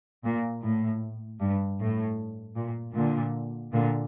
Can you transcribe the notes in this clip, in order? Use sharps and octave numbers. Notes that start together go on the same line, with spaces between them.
A#2
A2
G2
A2
A#2
A#2 D3
A#2 D3